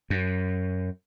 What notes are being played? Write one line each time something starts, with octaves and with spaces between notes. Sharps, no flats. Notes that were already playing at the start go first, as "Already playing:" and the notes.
F#2